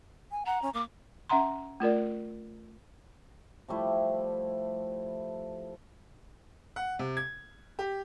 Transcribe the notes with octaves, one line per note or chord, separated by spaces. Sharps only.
G#5
F#5 A#5
C#4
A#3 D6
C#4 E5 F#5 A#5 C6
A3 F4 A#4 D5
F3 G3 A3 E4
F#5
C3
G#6
G4